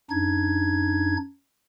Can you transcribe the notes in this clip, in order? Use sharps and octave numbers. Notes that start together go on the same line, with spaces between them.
F#2 D4 D#4 G#6